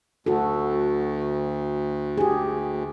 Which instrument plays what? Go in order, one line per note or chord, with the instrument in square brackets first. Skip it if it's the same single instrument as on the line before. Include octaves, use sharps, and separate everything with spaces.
[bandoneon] D2 [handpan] F#4 A4
[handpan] G4 G#4